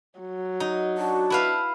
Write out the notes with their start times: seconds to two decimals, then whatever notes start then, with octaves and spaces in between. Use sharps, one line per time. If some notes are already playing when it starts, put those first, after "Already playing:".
0.20 F#3
0.60 D#4
0.97 D4 F#4 A5
1.30 E4 B4 F5